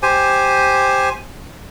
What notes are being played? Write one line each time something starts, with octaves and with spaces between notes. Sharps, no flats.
G4 C5 G#5